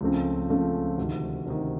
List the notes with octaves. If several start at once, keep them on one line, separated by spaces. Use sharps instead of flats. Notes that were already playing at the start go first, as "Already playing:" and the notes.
C#2 C#3 F3 A3 C4
C#2 C#3 F3 A3 C4
D2 C3 D#3
D2 C3 D#3